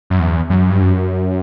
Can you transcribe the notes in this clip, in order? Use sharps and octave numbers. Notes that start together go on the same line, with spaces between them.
F#2
E2
F#2
G2
F#2